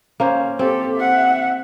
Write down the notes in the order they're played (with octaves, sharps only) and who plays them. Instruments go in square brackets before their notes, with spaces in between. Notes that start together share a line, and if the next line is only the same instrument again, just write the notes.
[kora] A#3 C#4 C5
[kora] C4 [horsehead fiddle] G4 A4
[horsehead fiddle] E5 F#5